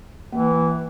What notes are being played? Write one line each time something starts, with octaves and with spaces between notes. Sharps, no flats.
E3 A#3